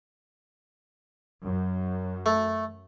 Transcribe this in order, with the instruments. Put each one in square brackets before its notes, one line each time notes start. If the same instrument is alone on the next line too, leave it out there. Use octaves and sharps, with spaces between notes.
[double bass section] F#2
[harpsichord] A3